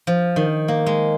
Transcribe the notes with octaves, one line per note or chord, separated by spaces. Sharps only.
F3
D#3
A#3
G#3